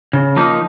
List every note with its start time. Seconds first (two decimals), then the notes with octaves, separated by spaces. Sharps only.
0.13 C#3
0.36 F3 A#3 D#4